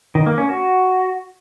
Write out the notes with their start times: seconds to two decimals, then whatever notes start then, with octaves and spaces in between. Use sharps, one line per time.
0.15 D#3
0.26 A#3
0.38 C#4
0.49 F#4